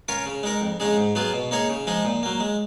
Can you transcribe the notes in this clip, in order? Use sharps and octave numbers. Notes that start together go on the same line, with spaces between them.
C#4 F4 A#4 C#5
C#3
G#3 D#4 A#4
F2
C#3 G#3 D#4 G#4
G#2
F#3 B3 F4 G#4
B2
A#3 D#4 G#4 C#5
C#3
F3 G#3 D#4 G#4
A#2
F#3 A#3
G#3